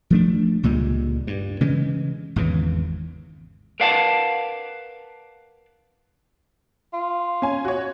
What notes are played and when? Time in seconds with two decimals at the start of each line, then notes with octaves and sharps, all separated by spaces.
0.10 F3 A3 D4
0.63 C#2 A#2 G3 G#3
1.27 G2
1.61 C#3 E3 G#3
2.36 G#1 E2 C#3 E3
3.80 A#4 B4 D5 F5 F#5 A5
6.93 F4
7.42 C#4 G#5
7.65 F#4 C#5